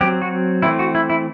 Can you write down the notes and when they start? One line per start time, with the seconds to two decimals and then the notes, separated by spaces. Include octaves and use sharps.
0.01 F#3 C4 G4
0.22 F#4
0.62 E3 A3 C4 E4
0.79 F#4
0.95 E4
1.10 E4